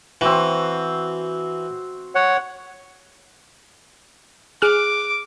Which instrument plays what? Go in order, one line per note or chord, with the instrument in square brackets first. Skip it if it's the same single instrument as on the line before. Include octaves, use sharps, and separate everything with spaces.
[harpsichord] E3 [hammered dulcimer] C4 F#4
[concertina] C#5 F#5
[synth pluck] G#4 F6 F#6 [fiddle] D6